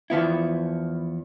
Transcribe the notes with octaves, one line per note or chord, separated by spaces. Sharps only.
E2 F3 B3 E4